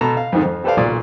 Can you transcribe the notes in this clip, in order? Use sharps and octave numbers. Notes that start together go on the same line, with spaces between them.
B2 A4 A#5
F5
F2 G#2 D#3
F2
G4 A4 B4 C5 D5 F5
B1 A#2 D5